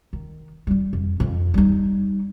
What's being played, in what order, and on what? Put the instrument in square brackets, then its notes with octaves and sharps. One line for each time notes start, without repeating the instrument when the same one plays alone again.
[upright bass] D#3
G3 F4
F2
F2
G3 D#4